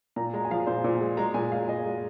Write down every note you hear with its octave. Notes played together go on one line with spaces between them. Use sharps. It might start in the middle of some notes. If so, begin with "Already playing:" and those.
A#2 A#5
G#3 A#5
G#5
F3 F5
A#2 C5
A#2
G#3
G#3 A#5
A#2 G#5
G#3 F5
A#2 D#5
G#3